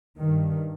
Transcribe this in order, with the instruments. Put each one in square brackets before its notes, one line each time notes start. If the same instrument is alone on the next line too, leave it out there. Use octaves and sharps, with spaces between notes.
[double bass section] G2 D#3